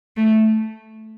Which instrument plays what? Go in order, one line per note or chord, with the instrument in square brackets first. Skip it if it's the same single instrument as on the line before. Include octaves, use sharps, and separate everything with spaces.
[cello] A3